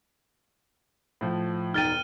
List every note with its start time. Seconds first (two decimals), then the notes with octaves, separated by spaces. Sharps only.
1.21 A2 F3
1.74 E1 D#4 G5 F6 A6 D#7